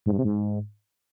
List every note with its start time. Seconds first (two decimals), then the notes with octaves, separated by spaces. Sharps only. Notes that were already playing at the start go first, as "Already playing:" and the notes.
0.06 G#2
0.12 G2
0.19 C3
0.25 G#2